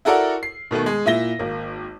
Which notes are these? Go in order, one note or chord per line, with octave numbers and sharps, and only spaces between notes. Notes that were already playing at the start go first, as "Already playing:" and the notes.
E4 F#4 A4 A#4 D5 F#5
C7
B2 D#3 A3 B3
G#3
A#2 E4 E5 A#6 G7
G#1 A#3